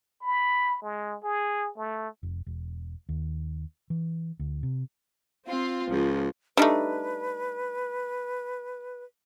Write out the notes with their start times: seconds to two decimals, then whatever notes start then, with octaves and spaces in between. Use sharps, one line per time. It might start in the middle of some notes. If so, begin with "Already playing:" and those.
0.22 B5
0.82 G#3
1.23 G#4
1.77 A3
2.23 F1
2.46 E1
3.09 D#2
3.90 E3
4.39 D2
4.63 C3
5.47 C4 F4
5.91 C#2 F3
6.57 G3 A3 D4 D#4 B4